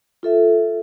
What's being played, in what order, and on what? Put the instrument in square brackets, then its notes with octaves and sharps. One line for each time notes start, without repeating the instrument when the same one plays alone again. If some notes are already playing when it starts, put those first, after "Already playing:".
[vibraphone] F4 A4 E5